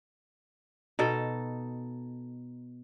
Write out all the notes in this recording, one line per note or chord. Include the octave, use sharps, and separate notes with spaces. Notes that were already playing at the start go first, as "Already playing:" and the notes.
B2 D#4 A4